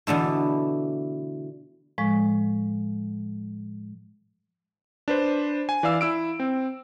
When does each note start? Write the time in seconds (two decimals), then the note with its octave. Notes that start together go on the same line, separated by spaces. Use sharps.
0.07 B2 D3 E3 A3
1.98 A2 F3 G#3 C#6
5.08 D4 B4 C5
5.69 G#5
5.83 E3 D5 F5 E6
6.01 E4 E6 D7
6.40 C4